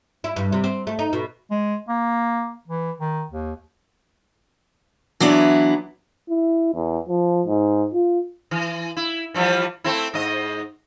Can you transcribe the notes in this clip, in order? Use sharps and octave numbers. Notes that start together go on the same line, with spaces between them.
E4
G2
C3
C4
A3
D#4
B2
G#3
A#3
E3
D#3
D#2
E3 F#3 B3 D4 E4
E4
E2
F3
G#2
F4
E3
E4
E3 F3 G3
A3 C4 E4
G#2 D#5